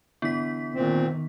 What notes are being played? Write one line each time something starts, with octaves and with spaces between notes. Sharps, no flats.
D3 E3 B3 B6
A#2 D#3 C4